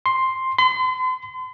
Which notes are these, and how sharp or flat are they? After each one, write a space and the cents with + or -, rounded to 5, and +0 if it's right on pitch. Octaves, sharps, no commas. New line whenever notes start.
C6 +5
C6 -40